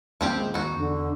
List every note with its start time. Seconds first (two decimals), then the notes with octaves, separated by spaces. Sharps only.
0.21 D#2 F3 A#3 C4 C#4 G4
0.38 D1 A#1 G#3
0.54 D#2 D#4 F#4
0.76 E2 D3